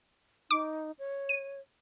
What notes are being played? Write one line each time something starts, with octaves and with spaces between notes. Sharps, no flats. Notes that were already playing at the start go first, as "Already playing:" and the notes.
D#4 D6
C#5
D#7